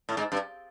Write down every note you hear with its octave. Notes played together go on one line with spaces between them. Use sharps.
A2
G#2
G2